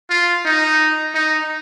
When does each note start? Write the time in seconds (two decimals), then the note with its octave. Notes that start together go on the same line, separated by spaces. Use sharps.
0.10 F4
0.45 D#4
1.14 D#4